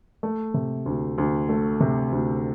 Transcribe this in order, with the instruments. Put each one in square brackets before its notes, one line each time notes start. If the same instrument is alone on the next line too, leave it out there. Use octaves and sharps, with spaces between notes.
[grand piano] A3
C3
D2
D2
A3
C3
D2